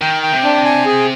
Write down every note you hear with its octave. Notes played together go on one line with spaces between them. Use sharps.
D#3 G5
G5
C3
D4
G#5
G#4